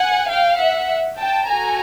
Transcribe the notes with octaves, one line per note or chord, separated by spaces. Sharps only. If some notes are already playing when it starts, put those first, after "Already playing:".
Already playing: F#5 G#5
F5 G5
E5 F#5
G5 A5
F#4 A4 G#5 A#5